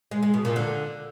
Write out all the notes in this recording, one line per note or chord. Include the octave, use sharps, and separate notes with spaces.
G#3
G#3
B2
A#2
D3